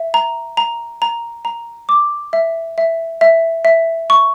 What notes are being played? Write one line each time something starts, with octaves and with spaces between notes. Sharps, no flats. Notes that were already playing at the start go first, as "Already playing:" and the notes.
Already playing: E5
A#5
A#5
A#5
A#5
D6
E5
E5
E5
E5
C#6